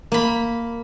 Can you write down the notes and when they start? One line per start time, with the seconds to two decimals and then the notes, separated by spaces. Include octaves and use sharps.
0.12 A#3 B5